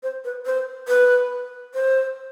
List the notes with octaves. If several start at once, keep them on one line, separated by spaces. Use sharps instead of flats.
C5
B4
C5
B4
C5